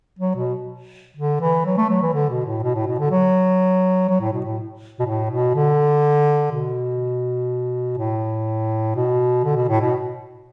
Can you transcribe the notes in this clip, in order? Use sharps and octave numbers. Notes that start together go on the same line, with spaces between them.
F#3
B2
D3
E3
F#3
A3
F#3
E3
D3
B2
A2
B2
A2
B2
D3
F#3
F#3
A2
B2
A2
B2
A2
B2
D3
B2
A2
B2
D3
B2
A2
B2